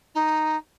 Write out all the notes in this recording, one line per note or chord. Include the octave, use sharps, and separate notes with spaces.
D#4